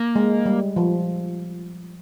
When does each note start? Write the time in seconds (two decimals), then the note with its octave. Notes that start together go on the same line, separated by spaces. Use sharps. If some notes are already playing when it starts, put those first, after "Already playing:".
Already playing: A#3
0.16 G#3
0.46 G3
0.76 F3